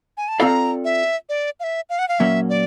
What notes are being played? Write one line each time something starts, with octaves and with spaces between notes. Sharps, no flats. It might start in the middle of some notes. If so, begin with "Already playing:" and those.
G#5
A5
C4 F4 A4 D5 F5 A#5 B5
E5
D5
F5
E5
F5
F#5
F5
A#2 F#3 A#3 C#4 E5
D5